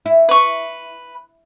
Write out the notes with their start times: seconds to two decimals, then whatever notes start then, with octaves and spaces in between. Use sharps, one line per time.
0.06 E4
0.29 B4 C#6